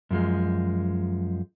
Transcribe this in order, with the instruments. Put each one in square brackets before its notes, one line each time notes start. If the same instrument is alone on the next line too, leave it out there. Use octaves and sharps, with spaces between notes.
[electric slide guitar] F#2 F3 G#3